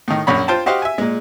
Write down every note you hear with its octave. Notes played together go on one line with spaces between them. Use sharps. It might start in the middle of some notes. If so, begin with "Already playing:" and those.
A2 D#3
A#1 F#2 C#5 B5
F4 C5 G5 A5
F#4 G4 C5 D#5 F5 F#5
E5 G#5
A#2 G#3